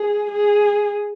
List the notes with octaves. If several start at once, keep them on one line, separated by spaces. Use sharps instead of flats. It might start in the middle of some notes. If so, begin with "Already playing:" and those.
Already playing: G#4
G#4